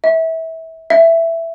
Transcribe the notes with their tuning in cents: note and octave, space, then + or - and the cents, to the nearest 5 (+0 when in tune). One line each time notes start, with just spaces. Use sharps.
E5 -25
E5 +10